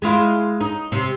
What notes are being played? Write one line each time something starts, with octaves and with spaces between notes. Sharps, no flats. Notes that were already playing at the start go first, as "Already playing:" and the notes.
G#3 E4 F4
D#4
C3